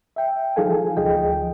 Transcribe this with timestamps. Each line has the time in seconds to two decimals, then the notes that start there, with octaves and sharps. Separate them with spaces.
0.16 E5 G5
0.56 F3 D#4 G#4 A4 F5 G#5
0.97 D2 F3 G#4 D#5 G5